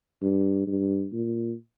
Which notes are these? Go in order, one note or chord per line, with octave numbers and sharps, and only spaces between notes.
G2
G2
A#2